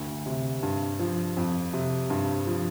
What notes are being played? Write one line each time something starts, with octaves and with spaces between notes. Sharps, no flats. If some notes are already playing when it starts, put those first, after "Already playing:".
Already playing: D2 G2 D3
C3
G2
F3
F2
C3
G2
F3